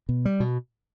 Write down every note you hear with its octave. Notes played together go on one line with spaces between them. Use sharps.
B2
G3
B2